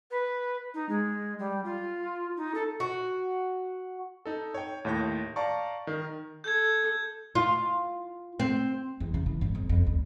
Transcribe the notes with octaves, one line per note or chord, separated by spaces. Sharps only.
B4
D#4
G#3
G3
F4
D#4
A4
F#4
D#4 A4
C#5 G5
D#2 A2 C#5 G6 A#6
D5 F5 A5 A#5 C#6
D#3 A#4
A4 G6 G#6
F4
C4
E2
C#3
E3
G#2
F2
F2
D2